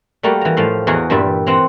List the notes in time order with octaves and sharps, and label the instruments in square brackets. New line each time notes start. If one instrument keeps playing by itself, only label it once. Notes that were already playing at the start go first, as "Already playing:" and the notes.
[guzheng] G3 A3 A#3 F#4 G4
E3 A#5
A2 F3 F5
E2 E3 F#4 G#4 A#4 D#5
G2 A#2 E3 G3 E5
E3 C4 F#5 A#5